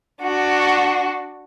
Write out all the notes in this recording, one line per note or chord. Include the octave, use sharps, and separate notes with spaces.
D4 F#4